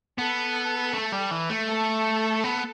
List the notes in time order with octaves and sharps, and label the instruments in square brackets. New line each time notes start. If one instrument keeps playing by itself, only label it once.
[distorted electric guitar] B3 [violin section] A4
[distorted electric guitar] A3
G3
E3
A3
[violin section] A4
[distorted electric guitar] B3